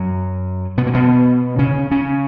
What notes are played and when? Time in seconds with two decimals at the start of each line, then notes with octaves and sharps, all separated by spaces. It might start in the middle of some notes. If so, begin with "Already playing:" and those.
Already playing: F#2 F#3
0.77 B2 B3
0.87 A#3
0.94 B2 B3
1.59 C#3 C#4
1.91 C#3 C#4